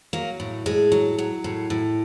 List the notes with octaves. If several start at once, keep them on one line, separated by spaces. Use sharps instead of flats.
F#3 A#3
A2
A2 G#3
F#3
F#3
A2
A2